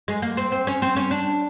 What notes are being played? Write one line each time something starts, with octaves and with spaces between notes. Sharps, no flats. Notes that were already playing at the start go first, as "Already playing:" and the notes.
G#3
A#3
C4
C4
C#4
C4
C#4
D4